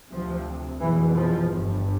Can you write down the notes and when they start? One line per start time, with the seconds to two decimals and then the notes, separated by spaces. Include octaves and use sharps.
0.10 D2 C3 F3
0.80 F1 E2 B2 E3
1.15 F3
1.51 G1 G2